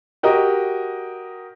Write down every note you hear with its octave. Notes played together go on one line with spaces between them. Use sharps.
F#4 G4 A#4 D#5